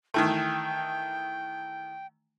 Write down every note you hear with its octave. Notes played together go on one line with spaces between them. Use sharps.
D#3 E3 A3 G5